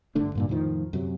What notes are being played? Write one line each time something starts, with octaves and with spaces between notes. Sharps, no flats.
G1 D3 A3 D4
G2 A#2 D3
F2 A2 D#3 F3
F#2 C3 F#3